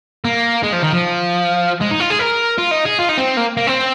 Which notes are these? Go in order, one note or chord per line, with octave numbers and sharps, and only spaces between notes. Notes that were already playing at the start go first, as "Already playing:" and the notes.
A#3
G#3
F3
D#3
F3
G#3
D#4
F4
G#4
A#4
F4
D#4
G#4
F4
D#4
C4
A#3
A#3
C4